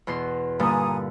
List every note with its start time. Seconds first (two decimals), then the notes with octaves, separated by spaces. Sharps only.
0.07 E2 B2 C6
0.59 G2 A#2 D3 G#5 A#5 D#6